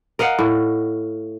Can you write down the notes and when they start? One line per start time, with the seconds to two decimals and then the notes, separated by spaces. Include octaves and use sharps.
0.19 A#4 D#5 F5 F#5
0.39 A2